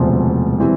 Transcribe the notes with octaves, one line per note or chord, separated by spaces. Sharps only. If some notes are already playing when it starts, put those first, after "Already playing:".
Already playing: E1 D2 C3 F3
E3 G3 C4